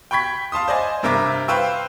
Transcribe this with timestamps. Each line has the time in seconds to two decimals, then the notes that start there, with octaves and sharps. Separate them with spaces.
0.11 G5 B5 C#6 G#6 B6
0.52 F5 A5 C6 D#6
0.68 C5 D5 D#5 G#5
1.03 G2 C3 A#4 E5 D6
1.48 B4 C5 F5 G5 C#6 E6